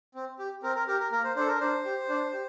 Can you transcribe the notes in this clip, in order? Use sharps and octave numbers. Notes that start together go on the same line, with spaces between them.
C4
G4
C4 A#4
A#4
G4 A#4
A#4
A#3 A#4
C5
D4 A4 C5
A#4
D4 C5
G4
D4
G4